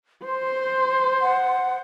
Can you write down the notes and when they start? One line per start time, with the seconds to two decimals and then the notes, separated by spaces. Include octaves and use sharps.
0.25 C5 C6
1.21 F#5